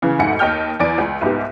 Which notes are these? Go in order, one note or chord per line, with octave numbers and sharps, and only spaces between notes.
C#3 E3
F1 D2 G#2 F#5 C#7
D#2 D#5 G5 F6 G6
E2 E3 D5 D7
C#2
C2 G#2 B3 G4